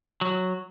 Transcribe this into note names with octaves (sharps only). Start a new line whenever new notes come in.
F#3